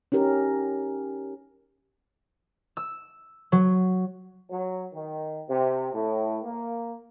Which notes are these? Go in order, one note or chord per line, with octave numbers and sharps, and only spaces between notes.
C#4 D#4 G4 A#4
E6
F#3
F#3
D#3
C3
A2
A#3